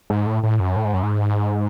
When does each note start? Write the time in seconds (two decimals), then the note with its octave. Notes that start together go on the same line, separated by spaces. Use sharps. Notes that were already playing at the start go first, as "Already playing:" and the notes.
0.10 G#2
0.27 A2
0.43 A2
0.60 F#2
0.76 A2
0.85 G#2
0.94 F#2
1.03 G#2